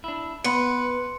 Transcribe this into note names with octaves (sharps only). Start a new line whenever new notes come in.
D4 E4
B3 B4 F#5 B5 C6 C#7